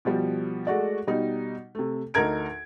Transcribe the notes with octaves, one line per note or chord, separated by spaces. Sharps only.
B2 F3 G3
G#3 A3 F#4 D5
B2 G3 D#4
C3 A3
D2 D#4 A4 A#4 G#6 D7